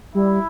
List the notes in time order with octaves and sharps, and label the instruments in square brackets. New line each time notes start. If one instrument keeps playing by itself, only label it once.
[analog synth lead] G3 [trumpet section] E4